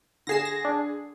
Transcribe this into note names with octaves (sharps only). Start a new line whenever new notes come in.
D3 G#4 A#6 C7 E7
A#6
D4